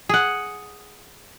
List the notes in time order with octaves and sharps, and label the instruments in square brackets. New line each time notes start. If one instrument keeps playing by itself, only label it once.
[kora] G#4 F#5